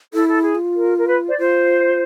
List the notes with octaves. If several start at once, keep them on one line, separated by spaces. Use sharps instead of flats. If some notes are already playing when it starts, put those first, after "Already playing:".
E4 A4
A4
G#4
F4
A#4
A#4
B4
C5 D5
F4 C5